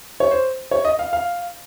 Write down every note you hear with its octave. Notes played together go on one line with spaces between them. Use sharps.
C#5
C5
C#5
D#5
F5
F5